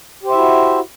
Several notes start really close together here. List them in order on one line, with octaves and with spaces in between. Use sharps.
G4 C5 E5 E4 F#4